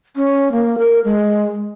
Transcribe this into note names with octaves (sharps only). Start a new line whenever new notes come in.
C#4
A#3
A#4
G#3